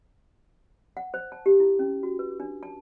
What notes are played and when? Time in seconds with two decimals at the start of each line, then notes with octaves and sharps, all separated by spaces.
0.97 F#5
1.14 C5
1.32 A5
1.46 G4
1.60 E4
1.79 C#4
2.03 F#4
2.19 B4
2.40 D4
2.63 A5